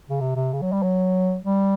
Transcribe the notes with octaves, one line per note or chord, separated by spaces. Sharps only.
C#3
C3
C3
C#3
F#3
G3
F#3
G3